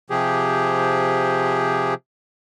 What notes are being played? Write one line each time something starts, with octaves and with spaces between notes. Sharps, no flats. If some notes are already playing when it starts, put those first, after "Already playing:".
C3 F3 G4 G#4